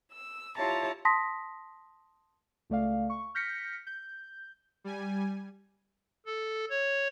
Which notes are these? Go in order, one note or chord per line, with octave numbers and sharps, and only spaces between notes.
E6
E4 F4 G4 C#5 A5 A#5
A5 C6 D#6 A#6 B6
C#2 A3 D5 F5
C#6
F6 G6 A#6 B6 C#7
G6
G3 G#5
A4
C#5